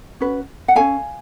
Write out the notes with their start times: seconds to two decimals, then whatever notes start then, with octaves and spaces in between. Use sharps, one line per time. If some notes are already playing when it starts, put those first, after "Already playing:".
0.20 C#4 F#4 B4
0.68 F#5
0.75 C#4 F#4 A4 F5 G#5